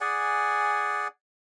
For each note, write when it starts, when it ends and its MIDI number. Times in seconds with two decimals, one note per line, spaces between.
0.01 1.08 68
0.01 1.08 74
0.01 1.08 78
0.01 1.08 80